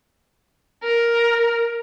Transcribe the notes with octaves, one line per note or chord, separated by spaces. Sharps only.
A#4